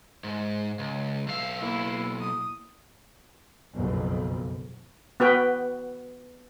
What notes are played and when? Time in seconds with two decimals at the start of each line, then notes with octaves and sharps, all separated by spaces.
0.24 G#2
0.79 C#2
1.27 B1 E5 F5
1.57 A#3 E4
2.20 D#6
3.75 F#1 B1 F2
5.20 B3 F#4 B4 G5